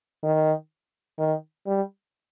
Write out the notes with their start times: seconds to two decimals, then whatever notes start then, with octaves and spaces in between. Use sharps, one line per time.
0.24 D#3
1.19 D#3
1.67 G3